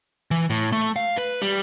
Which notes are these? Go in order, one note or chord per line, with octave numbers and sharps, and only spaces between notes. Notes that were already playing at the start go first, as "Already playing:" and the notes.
E3
A2
A3
F5
B4
G3